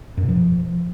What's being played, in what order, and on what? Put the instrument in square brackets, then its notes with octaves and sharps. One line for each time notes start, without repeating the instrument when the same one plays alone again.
[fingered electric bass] F#2
B2
F3